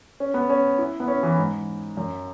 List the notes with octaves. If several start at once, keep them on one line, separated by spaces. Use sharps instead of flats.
C#4
B3
C#4
E4
B3
C#4
E3
G#2
F#2